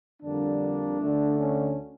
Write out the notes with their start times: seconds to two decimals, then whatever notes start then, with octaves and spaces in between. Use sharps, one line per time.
0.23 F2 D3 G3 A#3 D4
1.00 D2 D3 A3
1.38 C#4